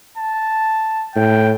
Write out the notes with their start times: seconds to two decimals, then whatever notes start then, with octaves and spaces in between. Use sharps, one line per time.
0.17 A5
1.16 A2 G5